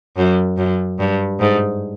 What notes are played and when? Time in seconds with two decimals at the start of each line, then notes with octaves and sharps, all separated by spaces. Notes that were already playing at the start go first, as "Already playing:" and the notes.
0.17 F#2
0.58 F#2
0.99 G2
1.40 G#2